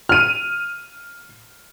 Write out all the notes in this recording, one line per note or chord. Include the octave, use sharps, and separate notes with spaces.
F6 D#7